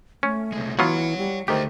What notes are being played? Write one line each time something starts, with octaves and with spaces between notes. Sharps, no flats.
A3 C#4
C2 G#3
E3 F#3 B3 F4 C#5 F#5
G3
D2 D#3 A3 G4 C5